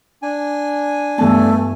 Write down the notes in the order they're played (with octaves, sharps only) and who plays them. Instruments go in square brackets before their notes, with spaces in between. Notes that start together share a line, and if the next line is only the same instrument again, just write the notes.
[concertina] D4 G#5
[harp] G2 E3 A5 [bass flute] A3 [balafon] B3